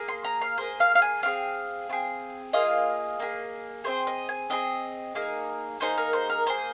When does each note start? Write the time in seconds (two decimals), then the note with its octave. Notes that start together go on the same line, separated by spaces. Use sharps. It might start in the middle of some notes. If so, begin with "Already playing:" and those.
Already playing: A#3 G#4
0.08 C6
0.25 A#5
0.41 F5
0.58 A#3 G#4 C5
0.80 F5
0.95 F5
1.02 G#5
1.23 C4 F4 G#4 F5
1.89 C4 F4
1.93 G#4
2.53 A#3 F4 G#4 D#5
3.20 A#3 F4 G#4
3.84 C4 D#4 G#4 C5
4.07 D#5
4.29 G#5
4.50 C4 D#4 G#4 D#5
5.15 A#3 D#4 G#4
5.80 A#3 D#4 G#4 C5
5.98 A#4
6.13 C5
6.30 A#4
6.46 A#3 G#4 C5